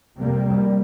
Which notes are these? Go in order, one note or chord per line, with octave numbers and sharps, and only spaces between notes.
F2 C3 G3 A#3